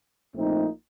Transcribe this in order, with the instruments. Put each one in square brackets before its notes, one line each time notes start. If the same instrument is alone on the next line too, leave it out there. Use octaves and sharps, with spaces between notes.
[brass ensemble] A#1 A#2 A3 C4 D#4